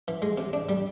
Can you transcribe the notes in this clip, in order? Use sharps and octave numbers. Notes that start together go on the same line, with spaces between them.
E3
G#3
C3
D4
G3